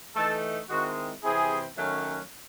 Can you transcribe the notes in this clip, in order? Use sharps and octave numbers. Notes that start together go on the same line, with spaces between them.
E3 A3 D#4 A4
D#3 G#3 C4 E4 F#4
C3 E3 C4 E4 G#4
D#3 F#3 A3 C#4